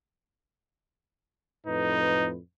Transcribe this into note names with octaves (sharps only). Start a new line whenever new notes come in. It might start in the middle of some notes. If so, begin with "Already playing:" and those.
F2 A2 D#4 B4